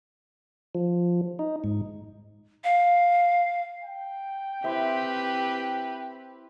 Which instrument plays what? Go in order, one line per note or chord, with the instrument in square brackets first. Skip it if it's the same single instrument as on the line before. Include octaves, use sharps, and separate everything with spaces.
[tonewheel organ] F3
D#4
G#2
[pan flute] F5
[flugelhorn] G5
[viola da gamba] C4 G4 B4 [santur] E4 C5 E5